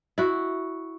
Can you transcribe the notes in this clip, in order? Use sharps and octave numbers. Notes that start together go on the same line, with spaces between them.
E4 F#4